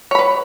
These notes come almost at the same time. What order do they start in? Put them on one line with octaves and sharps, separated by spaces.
C#5 B5 B4